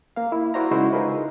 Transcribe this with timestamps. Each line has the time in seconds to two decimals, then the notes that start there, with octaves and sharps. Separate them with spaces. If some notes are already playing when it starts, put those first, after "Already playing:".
0.16 A#3 F5
0.32 E4
0.54 E4 F#4 A#4 C5 D5 A#5
0.71 C#3 G#3 D#4 E4 F#4 C5
0.93 D#4 F4 G#4 A#4 B4